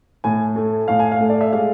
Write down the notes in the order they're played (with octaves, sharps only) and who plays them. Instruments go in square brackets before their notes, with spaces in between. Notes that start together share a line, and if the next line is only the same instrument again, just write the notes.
[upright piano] A2 G#5
A3
A2 F5
G#5
F5
A3
D5
E5
G#3 F5